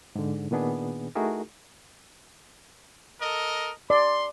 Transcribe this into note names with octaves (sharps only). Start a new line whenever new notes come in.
G#2 D3
A#2 D#3 B3 D4 G#4
A3 D#4 E4 F#4 G#4 A#4
A4 A#4 D#5
D5 C6